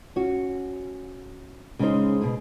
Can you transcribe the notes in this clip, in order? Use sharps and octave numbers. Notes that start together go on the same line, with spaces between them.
C#4 F#4
C#3 G#3 A#3 C#4 D#4 C5
B2 G#4